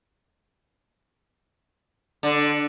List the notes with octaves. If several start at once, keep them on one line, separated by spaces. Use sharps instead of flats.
D3